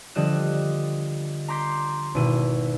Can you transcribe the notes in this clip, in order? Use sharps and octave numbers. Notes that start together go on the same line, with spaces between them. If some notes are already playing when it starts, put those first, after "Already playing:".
D3 F3 G3 D#5 F#6 E7
A#5 C6 D6 G6 B6 C7
G#1 B2 E4 D#7